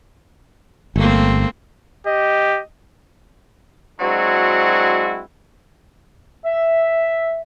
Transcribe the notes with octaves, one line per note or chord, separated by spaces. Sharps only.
G1 A3 A#3 C4
G4 D#5
F#3 G#3 C4 D4 E4 F#4
E5